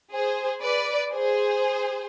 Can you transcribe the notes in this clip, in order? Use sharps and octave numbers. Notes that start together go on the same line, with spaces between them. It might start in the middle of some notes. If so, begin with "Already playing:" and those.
G#4 C5
B4 D5
G#4 C5